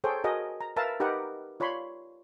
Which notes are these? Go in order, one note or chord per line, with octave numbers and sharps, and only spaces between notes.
G#4 A4 C5 C#5 G5
F#4 G#4 A#4 D#5
A#5
A#4 B4 E5 F5 A5 A#5
D#4 G4 A#4 B4 D#5 F#5
F4 C#5 D5 B5 C6